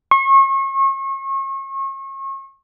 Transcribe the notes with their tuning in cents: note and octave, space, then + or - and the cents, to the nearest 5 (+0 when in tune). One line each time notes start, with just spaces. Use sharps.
C#6 -35